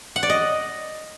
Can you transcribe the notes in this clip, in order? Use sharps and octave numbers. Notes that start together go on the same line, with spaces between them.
F#5
D5
D#5